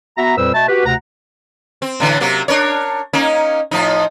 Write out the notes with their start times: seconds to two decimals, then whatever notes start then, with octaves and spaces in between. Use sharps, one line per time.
0.18 B3 F#4 E5 A#5
0.37 F2 A#2 G3 B4 C5 E6
0.54 B2 A3 A5
0.69 F#4 G4 B4
0.86 D2 C3 F#5 A#5
1.82 C4
2.00 A2 D3 E3
2.20 C3 F#3 A#3
2.48 D4 A#4 C#5
3.13 A#3 C#4 D#4
3.71 A2 F3 D#4